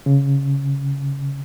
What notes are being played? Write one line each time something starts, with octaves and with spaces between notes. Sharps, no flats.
C#3